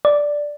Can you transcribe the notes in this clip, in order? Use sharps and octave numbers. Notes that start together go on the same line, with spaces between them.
D5